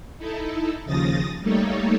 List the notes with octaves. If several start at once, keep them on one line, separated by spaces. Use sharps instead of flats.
D#4 E4 A4
D#2 C#3 F3 D#6 A6 A#6
G3 A3 A#3 D#4 A4 C#5